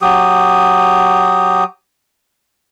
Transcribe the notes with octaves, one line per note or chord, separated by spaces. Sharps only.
F#3 G4 D#6